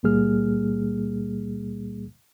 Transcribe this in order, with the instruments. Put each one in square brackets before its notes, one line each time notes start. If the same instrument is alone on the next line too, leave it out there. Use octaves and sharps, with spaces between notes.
[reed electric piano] C#2 A#2 G3 A#3 G#4 F6